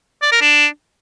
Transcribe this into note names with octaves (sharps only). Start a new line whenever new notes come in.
D5
A#4
D4